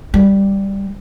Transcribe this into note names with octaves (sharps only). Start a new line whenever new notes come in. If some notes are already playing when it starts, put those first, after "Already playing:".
G3